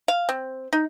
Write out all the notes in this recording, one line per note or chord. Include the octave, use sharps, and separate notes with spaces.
F5
C4
D#4